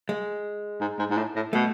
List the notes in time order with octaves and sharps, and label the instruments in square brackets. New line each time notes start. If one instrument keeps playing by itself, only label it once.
[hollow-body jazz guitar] G#3
[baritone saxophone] G#2
G#2
G#2
A2
A2
[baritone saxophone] B2 [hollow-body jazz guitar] A3